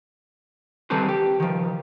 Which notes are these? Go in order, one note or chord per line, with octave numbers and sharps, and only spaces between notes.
D#3 G3 C4 A4 B4 C5
G4
D#3 F3